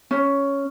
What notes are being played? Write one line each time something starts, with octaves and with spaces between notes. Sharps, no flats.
C#4